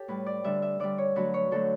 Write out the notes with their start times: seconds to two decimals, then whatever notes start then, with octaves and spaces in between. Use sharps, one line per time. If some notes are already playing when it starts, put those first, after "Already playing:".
Already playing: G4 A4 C#5
0.08 A2 G3 B4
0.26 D5
0.44 D3 G3 E5
0.62 E5
0.80 D3 G3 D5
0.98 C#5
1.16 D3 F#3 A3 B4
1.34 C#5
1.51 D3 F#3 A3 A4